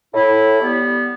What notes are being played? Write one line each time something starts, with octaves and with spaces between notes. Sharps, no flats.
A2 E4
G3 B3